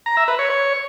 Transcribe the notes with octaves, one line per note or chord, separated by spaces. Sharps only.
A#5
E5
B4
C#5
C#5